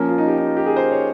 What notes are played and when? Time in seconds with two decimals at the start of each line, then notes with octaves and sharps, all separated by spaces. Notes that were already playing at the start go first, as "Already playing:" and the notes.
Already playing: F3 A#3 C#4
0.09 F4
0.18 D#4
0.27 G4
0.38 D#4
0.48 F4
0.57 G4
0.66 G#4
0.76 C5
0.91 C#5